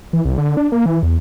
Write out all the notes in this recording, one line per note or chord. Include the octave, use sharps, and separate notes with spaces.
E3
C2
D3
D4
A#3
E3
E2